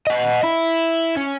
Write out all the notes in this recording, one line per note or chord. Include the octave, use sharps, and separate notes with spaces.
D#5 F#5
E4
C#4